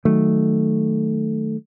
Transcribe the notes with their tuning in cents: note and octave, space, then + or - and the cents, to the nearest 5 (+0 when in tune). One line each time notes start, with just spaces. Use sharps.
D#3 +0 F#3 +0 A3 +0